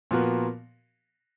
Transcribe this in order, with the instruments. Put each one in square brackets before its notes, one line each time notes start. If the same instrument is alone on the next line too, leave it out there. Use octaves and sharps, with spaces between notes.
[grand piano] A#2 F3 B3 F#4 A#4